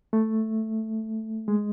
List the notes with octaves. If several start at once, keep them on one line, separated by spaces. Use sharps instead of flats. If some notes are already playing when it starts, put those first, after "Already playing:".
A3
G#3